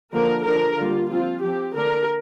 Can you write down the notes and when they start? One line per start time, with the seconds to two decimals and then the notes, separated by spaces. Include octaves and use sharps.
0.13 D3 F3 A#3 D4 A#4
0.45 D3 F3 D4 A#4
0.78 D3 G3 A#3 F4
1.10 F3 C4 F4
1.43 F3 C4 G4
1.75 D3 A#3 D4 A#4